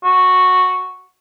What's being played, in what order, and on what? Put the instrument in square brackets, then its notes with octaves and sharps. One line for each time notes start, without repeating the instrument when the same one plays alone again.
[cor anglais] F#4